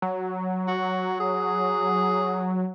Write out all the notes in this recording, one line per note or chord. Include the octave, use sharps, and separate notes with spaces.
F#3
F#4
G#4